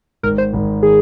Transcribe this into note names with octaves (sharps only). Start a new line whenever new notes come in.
G#1 G#2 D#3 A#4
C5
G#1 G#2 D#3
D#3 G#4